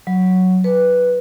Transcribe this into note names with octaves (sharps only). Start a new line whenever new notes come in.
F#3
B4